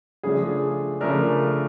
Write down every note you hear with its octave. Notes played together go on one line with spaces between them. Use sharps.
C#3 F3 A3 D4 G#4
C#3 F3 A3 D4 A#4